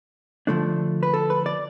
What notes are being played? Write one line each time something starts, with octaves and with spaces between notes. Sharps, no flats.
D3 F3 A3 D4
B4
A4
B4
D5